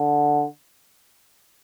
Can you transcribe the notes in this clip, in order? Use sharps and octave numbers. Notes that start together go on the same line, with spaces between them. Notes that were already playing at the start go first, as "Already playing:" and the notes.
Already playing: D3